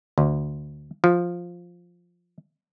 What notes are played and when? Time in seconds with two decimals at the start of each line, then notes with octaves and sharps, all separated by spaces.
0.18 D2
1.04 F3